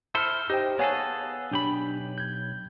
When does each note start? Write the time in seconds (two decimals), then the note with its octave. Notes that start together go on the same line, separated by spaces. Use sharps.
0.15 E4 A4 C5 E6 F6
0.50 D#4 G4 C5 G5
0.79 B3 G#4 A4 C#5 F5 G#5
1.51 B1 D4 G4 B5
2.18 G6 G#6